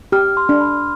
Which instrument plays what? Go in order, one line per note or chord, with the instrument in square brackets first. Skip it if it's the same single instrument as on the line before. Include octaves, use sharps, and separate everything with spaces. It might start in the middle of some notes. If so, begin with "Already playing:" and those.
[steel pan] G4 [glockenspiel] F6
[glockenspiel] C6
[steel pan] D4
[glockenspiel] B5